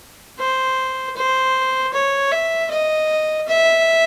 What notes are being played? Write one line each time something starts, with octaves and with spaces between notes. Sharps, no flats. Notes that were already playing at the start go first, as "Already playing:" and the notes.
C5
C5
C#5
E5
D#5
E5